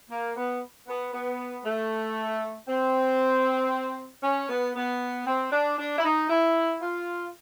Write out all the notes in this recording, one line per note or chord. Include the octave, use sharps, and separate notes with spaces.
A#3
B3
B3
B3
A3
C4
C#4
B3
B3
C4
D4
D4
E4
D#4
E4
F4